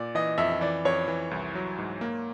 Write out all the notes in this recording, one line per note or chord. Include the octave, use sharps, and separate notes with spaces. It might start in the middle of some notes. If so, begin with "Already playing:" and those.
Already playing: A#2 D5
E3 D#5
F2 E5
E3 D5
F2 C#5
E3
C2
F#3
G#2
A#3